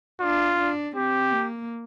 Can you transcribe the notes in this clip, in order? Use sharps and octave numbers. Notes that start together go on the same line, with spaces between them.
D4 F4
D4
C4 G4
A#3